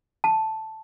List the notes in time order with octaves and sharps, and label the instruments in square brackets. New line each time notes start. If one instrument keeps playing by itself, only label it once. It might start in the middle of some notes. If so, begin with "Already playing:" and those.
[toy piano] A5